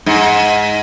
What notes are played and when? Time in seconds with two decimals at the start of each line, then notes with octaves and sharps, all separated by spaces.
0.06 G#2